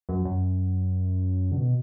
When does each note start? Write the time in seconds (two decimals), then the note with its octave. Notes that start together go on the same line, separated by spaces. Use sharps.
0.09 F#2
0.25 F#2
1.52 D3
1.57 B2